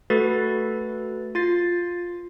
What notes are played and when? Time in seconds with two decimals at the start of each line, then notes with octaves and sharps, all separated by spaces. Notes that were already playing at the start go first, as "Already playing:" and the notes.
0.10 A3 F#4 A4 B4 A6
1.35 F4 A6 C7